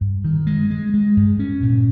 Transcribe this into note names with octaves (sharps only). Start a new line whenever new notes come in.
G2
D#3
G#3
G#3
G#3
G2
C#4
A#2